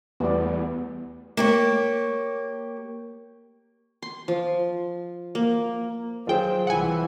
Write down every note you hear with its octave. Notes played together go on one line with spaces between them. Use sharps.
E2 G3 A3 B3 G4 D5
A#3 G4 C#5
C6
F3
A#3
D#2 F#3 F4 G#4 C5 G5
C2 E3 F#5 G#5